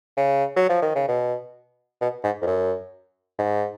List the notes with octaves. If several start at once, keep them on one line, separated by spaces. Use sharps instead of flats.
C#3
F#3
F3
D#3
C#3
B2
B2
G#2
F2
F#2
G#2